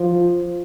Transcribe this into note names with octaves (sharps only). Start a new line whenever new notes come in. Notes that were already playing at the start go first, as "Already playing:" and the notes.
Already playing: F3